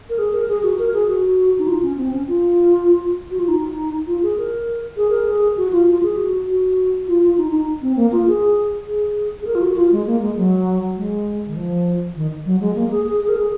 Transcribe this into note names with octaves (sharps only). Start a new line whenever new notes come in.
A#4
G#4
A#4
G#4
F#4
A#4
G#4
F#4
D#4
F4
C#4
C4
C#4
F4
F#4
F4
D#4
F4
G#4
A#4
G#4
A#4
G#4
F#4
F4
F4
G#4
F#4
F#4
F4
F4
D#4
D#4
C4
A#3
F4
G#4
G#4
G#4
A#4
F4
F#4
F4
G#3
A#3
G#3
F#3
G#3
D#3
F3
D#3
F#3
G#3
A#3
G#4
G#4
G#4
A#4
G#4